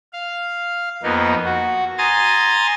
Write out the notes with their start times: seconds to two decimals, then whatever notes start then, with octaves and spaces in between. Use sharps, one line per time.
0.13 F5
1.03 F2 A#3 B3 D#4
1.45 F#4
1.98 G#5 A#5 C6 D#6 A6